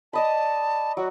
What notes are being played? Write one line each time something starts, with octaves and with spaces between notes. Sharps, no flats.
D5 D#5 A5 B5
F#3 F#4